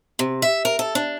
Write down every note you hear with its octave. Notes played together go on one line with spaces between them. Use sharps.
C3
E5
A#4
A4
D4